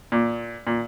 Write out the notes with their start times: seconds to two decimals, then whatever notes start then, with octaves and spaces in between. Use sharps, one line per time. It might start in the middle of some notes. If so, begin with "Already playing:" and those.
0.12 A#2
0.67 A#2